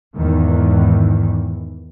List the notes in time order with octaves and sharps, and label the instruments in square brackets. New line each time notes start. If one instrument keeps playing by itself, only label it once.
[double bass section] E2 G#2 D#3 E3